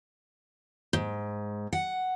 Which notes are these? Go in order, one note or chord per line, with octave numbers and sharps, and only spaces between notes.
G#2
F#5